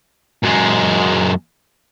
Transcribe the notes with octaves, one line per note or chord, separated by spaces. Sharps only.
F#2 G#3